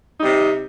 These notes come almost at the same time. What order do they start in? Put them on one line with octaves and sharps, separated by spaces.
D#4 G3 C3